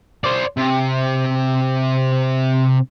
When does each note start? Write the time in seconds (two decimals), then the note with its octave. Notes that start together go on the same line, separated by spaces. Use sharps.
0.24 C5 D5
0.57 C3